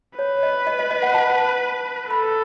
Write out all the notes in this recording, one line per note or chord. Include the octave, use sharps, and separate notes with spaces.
B4 C#5
D#5
D#5
D#5
D#5
F#5
A5
A4 B5